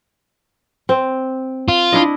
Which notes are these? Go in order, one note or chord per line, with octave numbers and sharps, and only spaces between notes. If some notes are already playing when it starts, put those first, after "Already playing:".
C4
F4
D4 E4 D#5